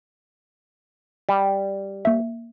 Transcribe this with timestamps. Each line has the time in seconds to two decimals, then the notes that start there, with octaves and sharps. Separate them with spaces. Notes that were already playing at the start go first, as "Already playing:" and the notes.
1.29 G3
2.05 A#3 E5